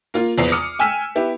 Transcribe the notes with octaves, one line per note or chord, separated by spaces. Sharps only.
A#3 F4
A#1 E2 B3 C7
D6 D#6 F6 C#7
G5 G#5 E6 F6 B6 E7
B3 E4 G4